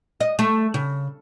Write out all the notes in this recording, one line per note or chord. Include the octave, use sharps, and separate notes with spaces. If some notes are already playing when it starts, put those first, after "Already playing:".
D#5
A3
C#3